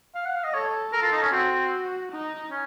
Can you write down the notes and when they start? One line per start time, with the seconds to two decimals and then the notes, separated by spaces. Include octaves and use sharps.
0.15 F5
0.26 F#5
0.35 F5
0.44 D#5
0.54 A4 C#5
0.93 A4 A#4
1.03 F4
1.13 D#4
1.23 C#4
1.32 C4 F#4
2.11 D#4
2.50 C#4